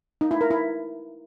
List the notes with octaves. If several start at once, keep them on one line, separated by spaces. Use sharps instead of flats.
D#4
E4
A#4
E4